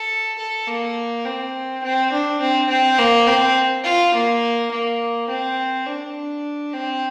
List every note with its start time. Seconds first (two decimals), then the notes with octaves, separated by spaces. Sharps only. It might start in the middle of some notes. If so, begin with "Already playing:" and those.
Already playing: A4
0.38 A4
0.67 A#3
1.25 C4
1.84 C4
2.12 D4
2.41 C4
2.69 C4
2.99 A#3
3.27 C4
3.85 F4
4.14 A#3
4.72 A#3
5.29 C4
5.86 D4
6.74 C4